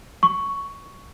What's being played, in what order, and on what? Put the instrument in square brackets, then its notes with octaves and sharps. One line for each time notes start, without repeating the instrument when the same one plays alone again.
[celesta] C#6